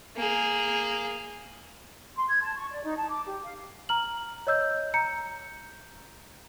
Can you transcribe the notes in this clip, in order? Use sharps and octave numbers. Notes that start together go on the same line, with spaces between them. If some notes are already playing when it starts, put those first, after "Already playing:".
A#3 G#4
C6
G#6
A5
C#6
D5
D#4
A5
D6
G4
F5
A#5 F6 F#7
C#5 D#5 E6 G6
A#5 G6 C#7